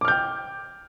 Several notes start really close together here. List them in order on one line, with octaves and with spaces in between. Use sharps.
D6 F6 G6 G5